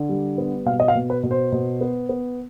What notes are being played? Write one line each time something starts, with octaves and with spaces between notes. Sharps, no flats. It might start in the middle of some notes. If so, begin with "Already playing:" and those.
Already playing: D3
G3
B3
B2 F5
D#5
F5
B2
B4
B2
C5
B2
B3
B3